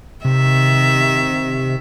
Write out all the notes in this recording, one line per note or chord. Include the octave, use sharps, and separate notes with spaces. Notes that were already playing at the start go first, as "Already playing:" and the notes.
C3 D#3 E5